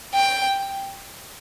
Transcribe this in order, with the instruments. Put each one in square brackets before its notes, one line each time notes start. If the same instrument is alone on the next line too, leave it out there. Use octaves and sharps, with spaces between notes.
[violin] G5